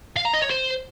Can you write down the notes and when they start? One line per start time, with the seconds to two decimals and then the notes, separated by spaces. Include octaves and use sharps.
0.16 F5
0.25 A#5
0.33 D#5
0.42 C#5
0.50 C5